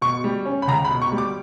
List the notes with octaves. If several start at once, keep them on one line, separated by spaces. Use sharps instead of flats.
B2 C#6
G3
C#4
B5
C#2 A#5
B5
B2
C#6
G3
D6